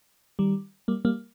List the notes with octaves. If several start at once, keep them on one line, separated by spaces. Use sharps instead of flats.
D#3 G3
G3 A#3
G3 A#3